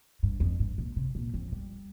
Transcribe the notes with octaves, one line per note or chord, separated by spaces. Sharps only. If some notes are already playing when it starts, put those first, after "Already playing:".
G2
F2
G2
A#2
C3
A#2
F2
G3